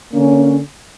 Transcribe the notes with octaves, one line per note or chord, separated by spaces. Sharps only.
D3 A#3 C#4